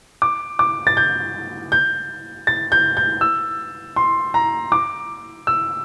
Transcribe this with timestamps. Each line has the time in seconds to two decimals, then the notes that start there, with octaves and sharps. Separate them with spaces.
0.22 D6
0.59 D6
0.87 A6
0.97 G6
1.72 G6
2.47 A6
2.72 G6
2.97 G6
3.21 E6
3.96 C6
4.34 A#5
4.72 D6
5.47 E6